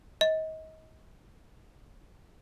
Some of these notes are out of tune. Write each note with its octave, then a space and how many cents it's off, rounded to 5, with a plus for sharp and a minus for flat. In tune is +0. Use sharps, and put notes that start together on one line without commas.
D#5 +30